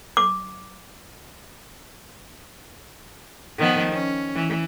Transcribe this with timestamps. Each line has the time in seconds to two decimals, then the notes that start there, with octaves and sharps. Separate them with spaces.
0.17 D6
3.58 D#3 F3 B3
3.93 C#4
4.35 E3